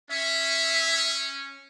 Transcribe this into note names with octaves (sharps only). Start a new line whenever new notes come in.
C#4 E5